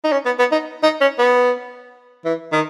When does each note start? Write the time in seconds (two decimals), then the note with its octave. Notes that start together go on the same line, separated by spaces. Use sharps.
0.04 D#4
0.12 C#4
0.26 B3
0.39 B3
0.52 D#4
0.83 D#4
1.01 C#4
1.19 B3
2.25 E3
2.52 D#3